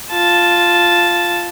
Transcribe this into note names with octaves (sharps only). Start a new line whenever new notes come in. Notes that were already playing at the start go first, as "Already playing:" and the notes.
F4 A5